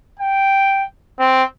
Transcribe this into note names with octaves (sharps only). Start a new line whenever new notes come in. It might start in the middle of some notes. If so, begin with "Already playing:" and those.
G5
C4